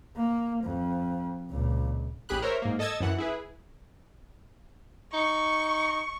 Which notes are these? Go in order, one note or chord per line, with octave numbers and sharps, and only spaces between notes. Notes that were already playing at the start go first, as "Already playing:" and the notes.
A#3
F2
C#2 A#2
A1 G4 G#4 B5 F#6
A#4 C5 C#5 E5
G#2 A#3
A4 D#5 A5 E6 G#6 A6
F#2 E3 F#5
E4 G#4 B4
D#4 C#6